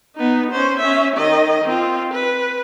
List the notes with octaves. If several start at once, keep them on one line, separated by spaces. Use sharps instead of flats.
B3 D#4
C#4 C5
C#4 E5
D#3 D#5
C4 F4
B4